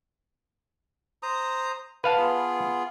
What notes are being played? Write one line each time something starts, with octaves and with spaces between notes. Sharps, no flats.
C5 A#5 D#6
B4 F5 F#5 A5
B3 F4 G#4